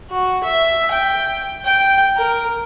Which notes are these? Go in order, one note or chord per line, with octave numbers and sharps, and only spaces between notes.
F#4
E5
G5
G5
A#4